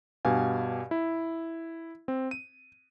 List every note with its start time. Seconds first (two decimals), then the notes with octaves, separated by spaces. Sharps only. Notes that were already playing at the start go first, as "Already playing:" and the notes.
0.25 G2 B2 G4 F5 G#5
0.91 E4
2.08 C4
2.31 D#7